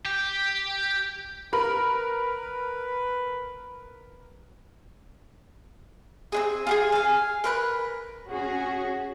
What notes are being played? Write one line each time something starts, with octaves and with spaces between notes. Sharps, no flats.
G4
A#4 B4 B5
C4 D4 G#4
F4 G4 G#4
F5 G#5
A#4 B4 F#6
C#4 F#4 G#4